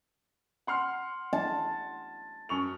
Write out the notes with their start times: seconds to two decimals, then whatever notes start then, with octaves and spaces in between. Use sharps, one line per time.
0.67 F#5 C6 F6
1.33 A5
2.49 F#2 C#6 F7